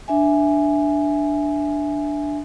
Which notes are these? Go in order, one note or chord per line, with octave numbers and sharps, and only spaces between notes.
D4 E5 G#5